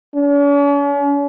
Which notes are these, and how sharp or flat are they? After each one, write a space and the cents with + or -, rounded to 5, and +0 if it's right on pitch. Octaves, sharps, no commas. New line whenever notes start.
C#4 +45